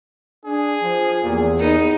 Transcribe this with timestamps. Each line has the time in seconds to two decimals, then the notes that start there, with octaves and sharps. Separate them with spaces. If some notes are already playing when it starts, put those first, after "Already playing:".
0.45 D4 G#4
0.82 F3
1.23 E2 A#2 G4
1.58 B3 D#4 A#4